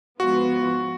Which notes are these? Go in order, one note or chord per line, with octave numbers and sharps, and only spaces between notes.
G#2 F3 B3 F4 F#4